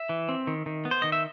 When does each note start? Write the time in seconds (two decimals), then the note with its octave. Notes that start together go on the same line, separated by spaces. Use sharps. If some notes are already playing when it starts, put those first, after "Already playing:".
Already playing: E5
0.09 E3
0.29 C4
0.47 D#3
0.66 D#3
0.85 B3
0.91 C5
1.02 D#3 D#5
1.12 E5